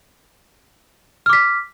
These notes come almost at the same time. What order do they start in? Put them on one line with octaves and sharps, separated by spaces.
F6 D6 B6